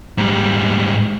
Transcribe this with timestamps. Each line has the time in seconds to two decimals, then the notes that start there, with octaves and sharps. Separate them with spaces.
0.18 G#2 G3